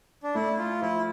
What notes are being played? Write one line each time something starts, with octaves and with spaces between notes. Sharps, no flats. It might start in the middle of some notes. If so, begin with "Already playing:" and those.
D4
A3 E4
F4
F3 E4